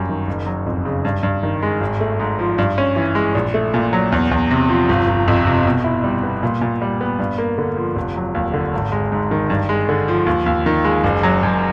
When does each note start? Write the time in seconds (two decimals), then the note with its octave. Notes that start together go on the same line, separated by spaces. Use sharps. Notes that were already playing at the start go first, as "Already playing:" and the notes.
Already playing: G1 F#2 G3
0.09 D#3
0.27 F#1
0.46 F#3
0.66 F2
0.85 C#3
1.05 G2
1.23 G2
1.43 D#3
1.62 G#3
1.81 G#1
2.00 A3
2.20 G#2
2.39 F3
2.58 G2
2.78 C#4
2.96 E3
3.15 G#3
3.35 A#1
3.54 A3
3.74 A#2
3.93 F#3
4.12 E2
4.31 E2
4.51 C3
4.69 F3
4.89 G1
5.08 G1
5.28 F2
5.46 C3
5.66 B2
5.84 E4
6.04 G3
6.23 B3
6.43 A#2
6.61 A#2
6.82 G3
7.01 B3
7.19 G2
7.38 A#3
7.58 D3
7.77 F3
7.96 F1
8.16 F#3
8.34 D#2
8.54 D3
8.73 G#1
8.92 G#3
9.12 G#2
9.31 D#3
9.50 G2
9.69 G#3
9.89 D3
10.08 F3
10.26 D#2
10.46 D#2
10.66 D#3
10.85 G#3
11.04 F#1
11.23 F#3
11.43 F#2